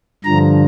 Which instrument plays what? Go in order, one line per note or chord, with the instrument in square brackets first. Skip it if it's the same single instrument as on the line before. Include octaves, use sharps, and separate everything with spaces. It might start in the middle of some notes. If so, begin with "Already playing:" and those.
[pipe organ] G2 D3 F3 A#5